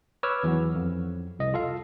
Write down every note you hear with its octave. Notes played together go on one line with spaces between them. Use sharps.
B4 C#5 D6 E6 F6
E2 E3 F#3 B3
F2
C2 D#5
F4 A4 F5